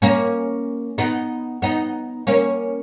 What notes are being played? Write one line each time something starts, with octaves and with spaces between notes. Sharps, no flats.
A#3 C#4
B3 D#4
B3 D#4
A#3 C#4